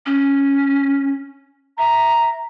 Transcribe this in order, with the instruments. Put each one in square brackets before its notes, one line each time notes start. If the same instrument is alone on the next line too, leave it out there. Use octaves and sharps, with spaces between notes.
[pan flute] C#4
[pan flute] E5 [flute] A#5